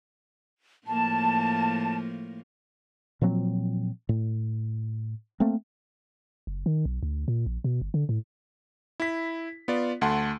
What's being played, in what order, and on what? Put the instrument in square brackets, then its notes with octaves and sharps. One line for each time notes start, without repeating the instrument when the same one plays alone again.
[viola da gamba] A2 F3 A#3 [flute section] A5
[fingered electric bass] A#2 F3 F#3 C4
A2
A3 A#3 C4
[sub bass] F#1
D#3
B1
D2
A#2
A#1
B2
G1
D3
A2
[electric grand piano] E4 B6
B3 F4 D5
D2 A3 F#5 A5 C6